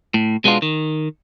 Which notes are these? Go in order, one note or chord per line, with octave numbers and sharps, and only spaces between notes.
A2
B2 G#3 B3 D4 F4
D#3